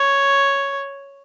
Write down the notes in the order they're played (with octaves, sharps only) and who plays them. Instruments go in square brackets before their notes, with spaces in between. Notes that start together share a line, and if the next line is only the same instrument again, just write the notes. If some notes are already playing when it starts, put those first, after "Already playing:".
Already playing: [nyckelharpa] C#5